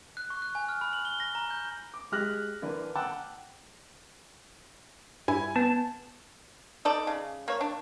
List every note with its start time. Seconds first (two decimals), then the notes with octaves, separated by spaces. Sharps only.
0.17 F#6
0.30 C#6
0.42 F#6
0.55 G#5
0.69 F6
0.81 B5
0.93 F#7
1.05 G7
1.20 A#6
1.35 A#5
1.50 G6
1.94 D6
2.12 G#3 G4 F6 F#6 A#6 F#7
2.62 D3 E3 D4 A#4 B4
2.96 F#5 G5 A5 D6 E6 F#6
5.28 G2 E4 G#5 G#6
5.56 B3 A5
6.85 D#4 A4 D5
7.07 C#3
7.48 A#3 C#5
7.61 D4